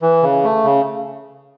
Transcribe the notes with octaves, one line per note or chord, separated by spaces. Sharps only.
E3
C#3
A3
C#3